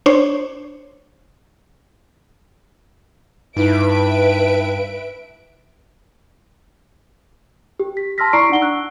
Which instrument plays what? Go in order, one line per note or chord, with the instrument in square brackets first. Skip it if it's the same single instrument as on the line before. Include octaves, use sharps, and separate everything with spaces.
[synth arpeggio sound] D4 C5 C#5
[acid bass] G2 [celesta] D#4 E4 [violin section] B4 E5 D7
[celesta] G4
B6
A5 C6 E6 F6 A#6 B6
E4 D5 A#5 C#6 C7 D7
D4 D#4 F#5 G7
E6 F#6